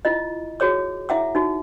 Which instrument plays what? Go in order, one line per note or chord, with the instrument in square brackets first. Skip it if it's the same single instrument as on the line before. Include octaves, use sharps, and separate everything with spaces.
[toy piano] E4 F4 D#5
F#4 G#4 C#5 D6
E4 E5 F#5 D6
D#4 F#4